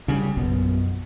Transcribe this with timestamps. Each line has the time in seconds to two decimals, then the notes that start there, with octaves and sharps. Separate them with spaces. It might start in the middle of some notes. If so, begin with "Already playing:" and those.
0.08 C#3 F#3 G3
0.37 A#1 F#2 B2